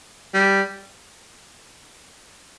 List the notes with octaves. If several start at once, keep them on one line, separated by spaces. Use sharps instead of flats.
G3